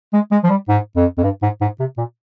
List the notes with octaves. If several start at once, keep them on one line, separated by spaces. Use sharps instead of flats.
G#3
G#3
F3
G3
G#2
F2
F2
G2
G#2
G#2
C3
A#2